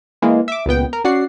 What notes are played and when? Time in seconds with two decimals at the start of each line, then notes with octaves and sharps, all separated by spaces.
0.22 E3 G#3 A#3
0.48 E5 D6
0.66 C#2 A#2 B3 G5
0.93 A#4
1.04 C#4 F#4 D5 F#5 C7